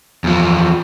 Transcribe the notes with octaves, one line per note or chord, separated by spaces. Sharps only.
E2 F3